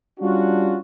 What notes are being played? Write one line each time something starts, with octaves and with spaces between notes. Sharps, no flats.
G3 C#4 D4 F4 F#4